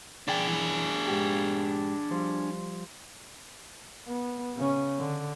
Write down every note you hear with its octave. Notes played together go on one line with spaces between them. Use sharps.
D4 G#4 D5 G5
F#2 E3
G#2 G4
F3 G3 C5
B3
C#3 C#4
D3